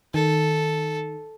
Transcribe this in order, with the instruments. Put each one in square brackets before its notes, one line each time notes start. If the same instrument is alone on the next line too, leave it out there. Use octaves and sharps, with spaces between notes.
[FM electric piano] D#3 [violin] A4